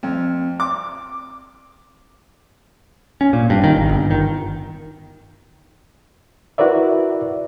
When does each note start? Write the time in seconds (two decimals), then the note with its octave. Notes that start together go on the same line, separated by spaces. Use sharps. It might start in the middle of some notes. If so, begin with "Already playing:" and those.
0.03 F2
0.60 D6
3.21 C#4
3.33 A#2
3.50 G2
3.64 D#3
3.77 G#1
3.89 G1
4.11 D#3
6.58 E4 F#4 A#4 B4 D5 E5